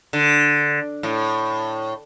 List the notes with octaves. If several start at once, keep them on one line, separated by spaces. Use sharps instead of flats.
D3
A2